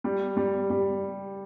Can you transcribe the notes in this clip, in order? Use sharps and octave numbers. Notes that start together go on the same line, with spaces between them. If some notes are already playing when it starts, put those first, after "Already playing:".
G3
G3
G3